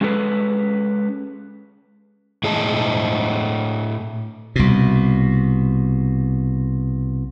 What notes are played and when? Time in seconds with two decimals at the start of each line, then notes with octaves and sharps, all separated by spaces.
0.01 G#3 C#4 G#4 A4 B4
2.44 A2 G#4 D#5 A5
4.56 C2 B2